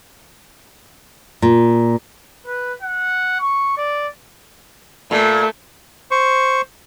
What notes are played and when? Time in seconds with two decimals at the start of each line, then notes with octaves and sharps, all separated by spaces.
1.42 A#2
2.47 B4
2.82 F#5
3.40 C#6
3.77 D5
5.11 A#2 A3
6.11 C5 C#6